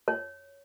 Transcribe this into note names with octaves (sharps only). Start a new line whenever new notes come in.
C#5